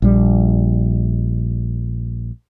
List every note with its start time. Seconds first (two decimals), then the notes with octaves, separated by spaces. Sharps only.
0.02 A#1 G3